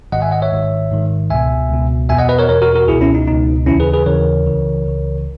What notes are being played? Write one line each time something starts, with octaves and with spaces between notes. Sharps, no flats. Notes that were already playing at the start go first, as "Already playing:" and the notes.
G#1 G#2 D#3 D#5 F#5
E5 G#5
D#5 F#5
C#5 E5
G#1 G#2 D#3
G#1 G#2 D#3
C#2 B2 E5 G#5
C#2 B2
E2 B2 E5 G#5
D#5 F#5
B4 D#5
A#4 C#5
E2 B2 A#4 C#5
F#4 A#4
F#4 A#4
C#2 B2 E4 G#4
C#4 E4
D#4
C#2 B2 D#4
D#2 C#3 E3 C#4 E4
G#4 B4
G#4 B4
D#2 C#3 E3 A#4 C#5
C#2 C#3 E3
C#2 C#3 E3